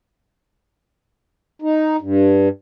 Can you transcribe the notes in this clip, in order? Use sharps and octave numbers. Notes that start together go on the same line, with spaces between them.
D#4
G2